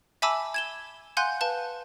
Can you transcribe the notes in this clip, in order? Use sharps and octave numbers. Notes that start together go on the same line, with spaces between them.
E5 G#5 A5 B5 D6 E6
G#6 E7 G7
F5 F#5 G#5 C6 F#6 G6
B4 F5 A5